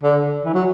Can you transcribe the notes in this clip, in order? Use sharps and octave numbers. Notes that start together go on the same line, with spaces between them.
D3
E3
F#3